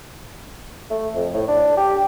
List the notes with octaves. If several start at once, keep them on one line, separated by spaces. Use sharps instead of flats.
A3
F2
A2
D4
G4